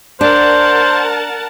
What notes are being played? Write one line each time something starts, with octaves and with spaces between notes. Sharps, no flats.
D4 A#4 C5 F#5 A5